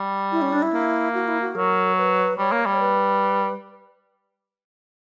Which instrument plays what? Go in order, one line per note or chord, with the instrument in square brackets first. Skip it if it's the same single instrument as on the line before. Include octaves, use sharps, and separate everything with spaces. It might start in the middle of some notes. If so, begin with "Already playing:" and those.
Already playing: [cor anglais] G3
[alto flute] E4
C#4
D4
E4
[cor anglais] A#3
[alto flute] F#4
E4
F#4
[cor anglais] F#3 [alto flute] A#4
[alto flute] B4
[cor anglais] G3 [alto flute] C#5
[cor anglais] A#3
G3
[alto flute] B4